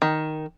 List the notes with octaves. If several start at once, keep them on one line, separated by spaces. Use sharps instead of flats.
D#3